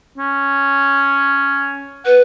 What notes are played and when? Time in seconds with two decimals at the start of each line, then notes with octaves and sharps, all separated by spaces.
0.18 C#4
2.06 B4 F#5